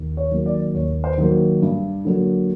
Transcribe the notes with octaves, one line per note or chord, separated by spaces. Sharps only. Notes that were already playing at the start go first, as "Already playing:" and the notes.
Already playing: D#2
C#5
D#3 F#3 A#3
D5
D#2 C#5
C5
D#3 F#3 A#3
G2
D3 F#3 A#3